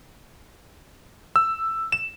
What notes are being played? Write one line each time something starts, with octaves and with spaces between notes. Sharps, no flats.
E6
E7